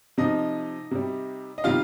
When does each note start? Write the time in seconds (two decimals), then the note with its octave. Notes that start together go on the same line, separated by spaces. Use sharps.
0.18 C3 F3 D#4 D#5
0.91 C3 G3
1.58 D#5
1.64 C3 D#3 G3 F4 F5